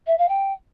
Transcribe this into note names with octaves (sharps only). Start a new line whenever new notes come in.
E5
F5
G5